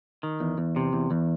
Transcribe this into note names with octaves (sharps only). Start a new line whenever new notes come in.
D#3
E2
E2
C3
E2
E2